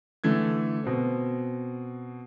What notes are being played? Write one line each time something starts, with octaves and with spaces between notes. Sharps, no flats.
D3 E3 A3 A4 G#6
B2 C4